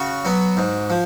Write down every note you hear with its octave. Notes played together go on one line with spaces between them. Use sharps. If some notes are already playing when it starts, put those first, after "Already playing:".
Already playing: C#3 F#4
F#3 B3
G#2
F3